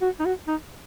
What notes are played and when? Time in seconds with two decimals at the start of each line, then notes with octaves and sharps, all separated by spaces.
0.02 F#4
0.20 D#4
0.25 F#4
0.48 D#4